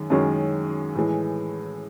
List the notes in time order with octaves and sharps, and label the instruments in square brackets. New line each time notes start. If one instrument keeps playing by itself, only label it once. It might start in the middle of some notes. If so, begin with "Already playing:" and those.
Already playing: [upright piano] F#2 D#3 G#3
F#2 D#3 G#3 C#4 F#4
A2 E3 G#3